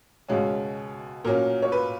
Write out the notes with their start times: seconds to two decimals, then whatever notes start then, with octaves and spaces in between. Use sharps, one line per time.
0.29 C#2 B2 G#3 C#4
1.25 A#2 F#3 C#4 A#4
1.62 C#5
1.72 B4